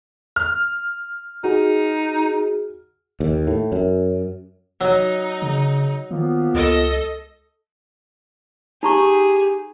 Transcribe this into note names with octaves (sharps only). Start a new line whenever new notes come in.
F6
D#4 F#4 G#4
D#2
A2
F#2
F#3 D#4
C#3
D#3 F3 A#3 B3
C#2 A4 D#5
D#4 G4 G#4 A#5 C#6